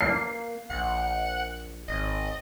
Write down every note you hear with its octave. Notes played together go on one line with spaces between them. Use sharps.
A#3 C7
A#1 F#5
G#1 D#5